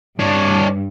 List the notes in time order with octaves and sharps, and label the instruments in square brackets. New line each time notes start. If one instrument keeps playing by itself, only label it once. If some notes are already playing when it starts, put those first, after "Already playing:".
[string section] G2 [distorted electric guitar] D4 C#5